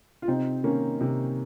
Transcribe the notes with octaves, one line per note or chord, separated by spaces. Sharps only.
F4
C3 C4 D#4
D#3 A#3 C#4
C3